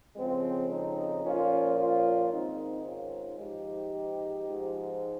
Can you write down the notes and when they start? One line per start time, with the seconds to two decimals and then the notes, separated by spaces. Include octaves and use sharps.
0.16 F2 C#3 F3 G#3 C4
0.70 C4 D#4
1.24 A#2 F3 C#4 F4
1.79 C#4 F4
2.32 G#2 D#3 C4 D#4
2.87 C#4 F4
3.40 G#2 F3 D#4 G4
4.49 G#2 F3